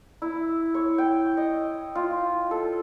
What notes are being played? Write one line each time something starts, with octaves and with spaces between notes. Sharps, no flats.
E4
C#5
G5
D#5
F4
A4